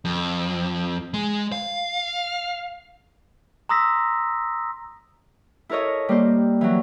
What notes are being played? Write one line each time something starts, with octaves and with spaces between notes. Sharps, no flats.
F2
G#3
F5
A#5 C6 D#6 E6 A#6 B6
E4 A4 A#4 C#5 D#5
G3 A#3 C5
E3 F#3